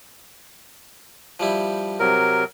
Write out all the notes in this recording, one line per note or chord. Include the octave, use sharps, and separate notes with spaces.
F3 G3 E4
C3 F#3 A#4